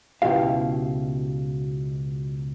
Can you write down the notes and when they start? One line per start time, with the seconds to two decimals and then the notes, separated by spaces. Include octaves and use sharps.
0.22 C#2 B2 D#3 E4 G4 F5